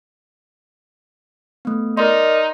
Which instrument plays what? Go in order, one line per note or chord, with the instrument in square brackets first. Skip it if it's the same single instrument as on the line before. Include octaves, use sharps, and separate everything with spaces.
[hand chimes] A3 B3
[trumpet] D#4 [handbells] A#4 D5 D#5 [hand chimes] C6